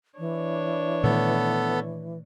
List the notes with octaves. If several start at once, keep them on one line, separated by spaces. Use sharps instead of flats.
E3 D4 C#5
A#2 D#3 A3 B3 A4